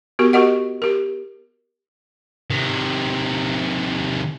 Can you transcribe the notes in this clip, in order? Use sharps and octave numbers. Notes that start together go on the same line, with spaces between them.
B3 F#4 G4 A#4
F#4 G4 A#4 D#5 F#5
G4 A#4
C3 D#3